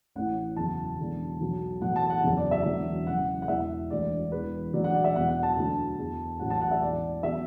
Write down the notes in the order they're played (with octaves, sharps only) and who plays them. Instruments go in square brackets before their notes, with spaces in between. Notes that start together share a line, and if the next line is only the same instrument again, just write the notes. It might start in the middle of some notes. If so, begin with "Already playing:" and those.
[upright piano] A1 A2 E3 F#5
F#1 E2 B2 F#3 A5
E1 E2 D3 F#3
B1 B2 F#3
B1 A2 E3 F#5
A5
F#5
F#1 E2 D3 F#3
D5
E5
E1 E2 D3 F#3
F#1 F#2 E3 F#5
F#5
E1 E2 E3 E5
E1 D2 D3 D5
E1 E2 E3 B4
E1 D2 D3 F#3 D5
F#5
D5
E5
E2 B2 F#3 F#5
F#5
A5
D2 D3 F#3
E2 E3
A1 A2 F#3 F#5
A5
F#5
E5
E1 E2 E3 D5
B2 F#3 E5